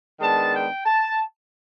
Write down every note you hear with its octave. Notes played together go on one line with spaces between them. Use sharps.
D#3 G#3 B3 D4 A5
G5
A5